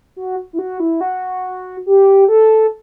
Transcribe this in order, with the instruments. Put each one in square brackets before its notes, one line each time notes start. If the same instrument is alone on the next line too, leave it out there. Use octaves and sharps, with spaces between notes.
[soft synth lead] F#4
E4
F#4
E4
F#4
G4
A4